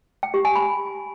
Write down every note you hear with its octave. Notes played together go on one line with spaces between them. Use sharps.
G5
G4
G#5
B5